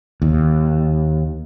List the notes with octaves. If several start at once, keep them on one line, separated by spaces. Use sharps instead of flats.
D#2